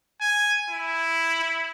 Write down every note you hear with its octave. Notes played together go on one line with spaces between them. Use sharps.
G#5
E4